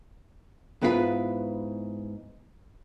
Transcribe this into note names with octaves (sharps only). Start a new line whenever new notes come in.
G#2 B3 E4 F4 G4 B4